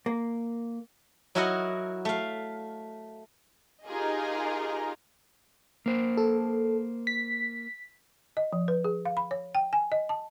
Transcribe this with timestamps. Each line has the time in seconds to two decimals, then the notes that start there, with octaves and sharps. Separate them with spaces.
0.06 A#3
1.35 F#3 E4 F#4 A#4 D#5 F#5
2.05 A3 F5
3.86 D#4 F4 G4 G#4 A#4 D#5
5.86 A#3 C5
6.17 A4
7.07 B6
8.37 D#5
8.53 F3
8.68 B4
8.84 G#4
9.05 F5
9.17 B5
9.31 C#5
9.55 G5
9.73 G#5
9.92 D#5
10.09 A5